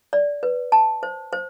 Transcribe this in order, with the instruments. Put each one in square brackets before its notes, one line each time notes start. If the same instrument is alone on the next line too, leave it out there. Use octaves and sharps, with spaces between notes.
[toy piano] D5
B4
A5
C5
C5